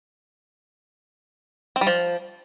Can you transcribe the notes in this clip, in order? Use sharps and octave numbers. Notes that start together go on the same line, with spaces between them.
C4
G3
F3